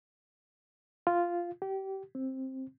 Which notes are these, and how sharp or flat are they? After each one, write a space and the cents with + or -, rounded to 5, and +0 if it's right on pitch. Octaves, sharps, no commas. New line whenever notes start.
F4 -5
G4 -25
C4 +10